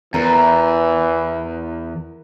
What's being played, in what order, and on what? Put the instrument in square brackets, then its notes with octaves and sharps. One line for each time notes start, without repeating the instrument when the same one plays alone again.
[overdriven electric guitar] E2 [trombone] E3 [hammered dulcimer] A#4